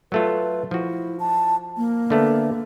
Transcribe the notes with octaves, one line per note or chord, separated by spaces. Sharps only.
F#3 A3 F4 B4
F3 E4 F#4
A5
A#3
D3 A3 B3